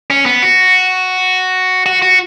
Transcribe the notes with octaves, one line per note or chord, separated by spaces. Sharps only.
C#4
B3
F#4
F#4
F#4